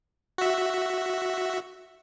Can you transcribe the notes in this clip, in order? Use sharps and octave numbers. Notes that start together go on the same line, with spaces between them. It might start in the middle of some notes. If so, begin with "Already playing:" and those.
F#4 E5